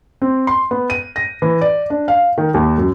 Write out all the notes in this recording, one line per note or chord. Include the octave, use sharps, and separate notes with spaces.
C4
C6
B3
D#7
A#6
E3
D5
D4
F5
D#3
D#2
F#2